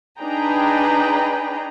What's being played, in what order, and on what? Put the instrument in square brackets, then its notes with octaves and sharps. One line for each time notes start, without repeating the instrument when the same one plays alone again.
[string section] D4 D#4 G#4 B4 G5 A#5